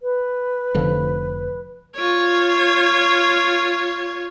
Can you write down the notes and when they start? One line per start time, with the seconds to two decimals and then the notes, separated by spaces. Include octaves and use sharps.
0.01 B4
0.74 F1 D3 F3
1.96 F4 C#5